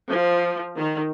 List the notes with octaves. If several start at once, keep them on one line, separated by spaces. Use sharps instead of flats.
F3
D#3